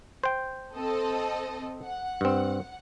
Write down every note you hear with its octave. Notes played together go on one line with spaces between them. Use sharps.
C5 G5
C4 A4 D#5
F#5
G2 C4